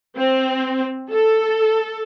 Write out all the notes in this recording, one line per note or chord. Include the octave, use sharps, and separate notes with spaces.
C4
A4